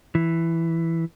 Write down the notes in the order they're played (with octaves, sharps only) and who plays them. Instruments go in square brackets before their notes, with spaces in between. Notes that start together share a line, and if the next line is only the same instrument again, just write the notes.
[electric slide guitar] E3